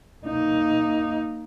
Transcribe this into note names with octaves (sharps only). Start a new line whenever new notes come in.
A#3 D#4